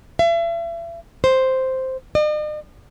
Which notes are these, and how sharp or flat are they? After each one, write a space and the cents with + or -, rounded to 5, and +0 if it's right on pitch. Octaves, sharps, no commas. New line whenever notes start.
E5 +40
C5 +0
D#5 -45